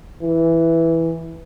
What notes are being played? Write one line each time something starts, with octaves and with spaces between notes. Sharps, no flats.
E3